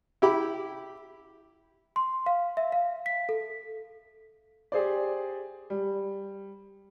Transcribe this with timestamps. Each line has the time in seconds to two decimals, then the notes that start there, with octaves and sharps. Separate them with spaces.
0.22 E4 G4 B5
1.96 C6
2.26 F5
2.57 E5
2.72 F5
3.06 B6
3.29 A4
4.72 G4 G#4 C5 D5
5.70 G3